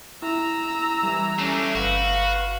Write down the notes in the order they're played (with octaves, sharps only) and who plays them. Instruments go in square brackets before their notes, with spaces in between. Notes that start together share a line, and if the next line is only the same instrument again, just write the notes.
[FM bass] E4 [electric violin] A#5 E6
[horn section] E3 [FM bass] G3
[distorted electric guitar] A3 D4 [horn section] C#4
[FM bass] G1 [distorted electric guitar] F#4 [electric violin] B4 [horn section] F5